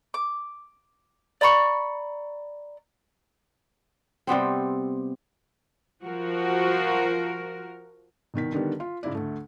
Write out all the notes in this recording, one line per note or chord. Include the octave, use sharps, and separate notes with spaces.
D6
D5 A#5 B5 C#6
C3 G3 B3 C4
F3 F#4 A#4
C2 B2 D#3 B6
D3 D#3 G3 B3
F4
G#2 C#3 E4 D5
D2 A3